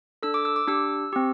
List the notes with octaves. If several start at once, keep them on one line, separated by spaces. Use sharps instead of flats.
D4 A4 E6
D6
E6
D6
D4 G4 E6
C4 G4